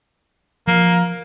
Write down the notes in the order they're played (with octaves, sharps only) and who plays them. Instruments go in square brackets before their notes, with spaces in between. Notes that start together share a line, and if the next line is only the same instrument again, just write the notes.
[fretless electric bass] F3 [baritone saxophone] A#3